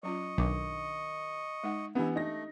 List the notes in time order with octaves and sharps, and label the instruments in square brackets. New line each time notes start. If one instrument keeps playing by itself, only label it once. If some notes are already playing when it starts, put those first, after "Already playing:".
[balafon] F#3 C#4 F4 [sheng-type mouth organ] D#5 C#6
[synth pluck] B1 [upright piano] D#3 [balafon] D4 D6
[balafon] G#3 D#4 F#5
[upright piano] E3 B3 [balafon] C#4 D4 G4 [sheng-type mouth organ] E4
[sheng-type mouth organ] A3 [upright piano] D#4 A#6